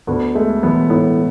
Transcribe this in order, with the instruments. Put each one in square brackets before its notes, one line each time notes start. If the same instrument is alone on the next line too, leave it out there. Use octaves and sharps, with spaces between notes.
[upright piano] D2 [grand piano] B3
[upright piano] G#3 [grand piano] A3
[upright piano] E1 [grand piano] B3
[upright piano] A2 [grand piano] B3